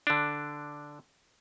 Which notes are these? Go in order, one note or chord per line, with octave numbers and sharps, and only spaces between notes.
D3 D4